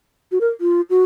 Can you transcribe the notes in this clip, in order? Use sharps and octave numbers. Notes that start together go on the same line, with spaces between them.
F#4
A#4
F4
F#4